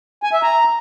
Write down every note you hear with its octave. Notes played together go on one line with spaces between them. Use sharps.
G#5
E5
A#5